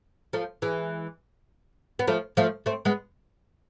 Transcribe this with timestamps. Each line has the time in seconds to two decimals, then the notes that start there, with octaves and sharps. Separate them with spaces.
0.33 F3 A3
0.62 E3 G#3
1.99 B3
2.08 F3 A3
2.37 F3 A3
2.66 A3 C4
2.85 G#3 B3